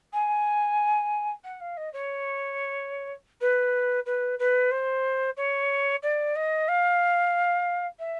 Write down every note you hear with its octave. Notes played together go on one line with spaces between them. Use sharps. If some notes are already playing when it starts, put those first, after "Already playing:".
G#5
F#5
F5
D#5
C#5
B4
B4
B4
C5
C#5
D5
D#5
F5
E5